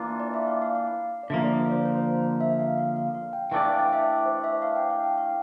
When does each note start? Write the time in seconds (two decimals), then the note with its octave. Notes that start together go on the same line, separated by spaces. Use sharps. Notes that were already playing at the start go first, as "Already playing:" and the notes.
Already playing: E3 A#3 D4 F4
0.20 D5
0.34 E5
0.48 F5
0.62 F5
0.75 F5
1.23 D5
1.30 D3 F3 A#3 E5
1.45 D5
1.58 D5
1.71 C5
1.85 C5
2.41 E5
2.59 F5
2.78 F5
2.96 F5
3.14 F5
3.33 G5
3.52 E3 A3 D4 A4 D5 G5
3.66 F5
3.79 G5
3.93 E5
4.25 C5
4.44 E5
4.62 F5
4.76 G5
4.90 F5
5.04 G5
5.18 F5